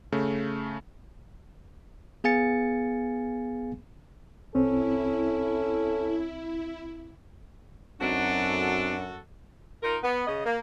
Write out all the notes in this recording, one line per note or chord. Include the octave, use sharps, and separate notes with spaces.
C#3 A3
B3 G#4 F5 G#5 A6 C#7
C2 C4 C#4 E4 A4
F#2 C4 D4 D#4 F#4 A4
D#4 F4 A#4
B3
C#3 D#5
A#3